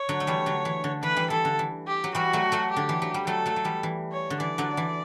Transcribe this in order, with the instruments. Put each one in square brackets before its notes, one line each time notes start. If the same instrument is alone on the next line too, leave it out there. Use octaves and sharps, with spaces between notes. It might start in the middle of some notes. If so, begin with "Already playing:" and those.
Already playing: [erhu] C#5
[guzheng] D3 F#3
A3
E3 G3
D3 F#3
E3
D3
[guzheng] E3 [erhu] B4
[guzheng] E3 G3
[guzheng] E3 [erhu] A4
[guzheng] D3
E3
[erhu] G4
[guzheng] F#3
[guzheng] E3 G3 [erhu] F#4
[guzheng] F#3 A3
F#3 A3
[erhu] G4
[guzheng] D3
E3
F#3
G3
[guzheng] F#3 A3 [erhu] A4
[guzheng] F#3 A3
F#3
E3 G3
E3
[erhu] C#5
[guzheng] D3
[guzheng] E3 [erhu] D5
[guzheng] D3 F#3
E3